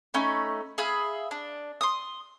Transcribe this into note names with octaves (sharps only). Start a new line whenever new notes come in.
A3 C#4 D#4 B5
G#4 E5 F5 B5
D4
C6 D#6